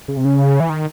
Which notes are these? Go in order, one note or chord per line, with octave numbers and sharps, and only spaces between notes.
C#3
C3
C#3
E3
D#3